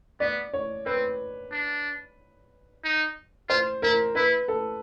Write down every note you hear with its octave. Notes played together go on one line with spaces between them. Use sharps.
B3 D5
C#5
C4 B4
D4
D#4
F4 C5
E4 A#4
E4 B4
A4